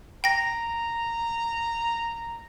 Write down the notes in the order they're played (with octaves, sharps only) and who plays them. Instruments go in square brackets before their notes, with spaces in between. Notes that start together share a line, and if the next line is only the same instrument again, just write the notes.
[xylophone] G5 A#6 [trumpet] A#5